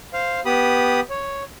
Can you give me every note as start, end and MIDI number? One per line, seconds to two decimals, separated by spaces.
0.13 0.40 72
0.13 0.40 77
0.45 1.00 59
0.45 1.00 67
0.45 1.00 83
0.45 1.00 87
1.10 1.43 73